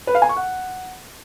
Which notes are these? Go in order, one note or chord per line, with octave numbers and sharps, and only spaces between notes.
B4
F5
G#5
C#6
F#5